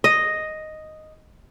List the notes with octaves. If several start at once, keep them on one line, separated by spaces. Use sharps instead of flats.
D#5